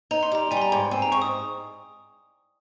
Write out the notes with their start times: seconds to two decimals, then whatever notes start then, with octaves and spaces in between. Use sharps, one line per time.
0.11 D#4 A#5
0.23 C6
0.32 G3 A#5
0.51 G3 G#5
0.57 C6
0.62 A#5
0.72 G#2
0.91 C4 G#5
1.02 A#5
1.12 G#2 C#6
1.22 D#6